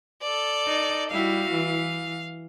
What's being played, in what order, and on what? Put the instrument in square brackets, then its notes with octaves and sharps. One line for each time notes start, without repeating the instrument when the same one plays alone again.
[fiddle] A4 D5
[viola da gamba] D#4
[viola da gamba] G3 E4 F#4 [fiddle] F5
[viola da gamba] E3